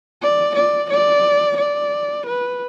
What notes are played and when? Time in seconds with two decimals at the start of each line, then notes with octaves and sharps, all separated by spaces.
0.22 D5
0.56 D5
0.90 D5
1.57 D5
2.26 B4